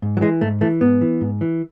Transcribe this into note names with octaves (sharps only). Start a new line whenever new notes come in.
G#2
F#3
E3 G#3
G#2 A3
E3 A3
G#2 B3
E3
G#2
E3